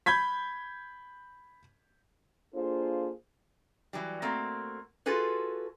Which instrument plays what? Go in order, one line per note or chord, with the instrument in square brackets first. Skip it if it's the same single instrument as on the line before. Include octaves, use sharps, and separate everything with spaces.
[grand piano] B5 G6 G#6 B6
[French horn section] A#3 D4 F4 G#4 A4 C5
[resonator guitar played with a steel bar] E3 F#3 G3
A3 A#3 C4 F#4
F4 F#4 G#4 A4 B4